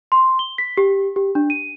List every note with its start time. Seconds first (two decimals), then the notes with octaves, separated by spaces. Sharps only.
0.12 C6
0.39 G7
0.58 B6
0.77 G4
1.16 G4
1.35 D4
1.50 D#7